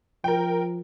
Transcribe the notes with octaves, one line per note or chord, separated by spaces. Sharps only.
F3 A#4 G5